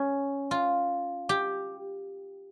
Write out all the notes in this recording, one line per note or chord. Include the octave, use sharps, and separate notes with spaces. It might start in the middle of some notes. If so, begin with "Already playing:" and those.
Already playing: C#4
F4
G4